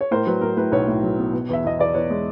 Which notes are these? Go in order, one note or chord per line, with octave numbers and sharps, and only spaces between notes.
C#5
A2 A#4 C5
F#3 B4
A2 A#4
A2 B4
B1 B4 C#5
A2
F#3
B3
B2
E2 E5
E2 D#5
E2 D5
E2 B4 C#5
G#3